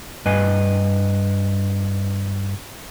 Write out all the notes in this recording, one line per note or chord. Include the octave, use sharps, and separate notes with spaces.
G2 B4 D#5 G#5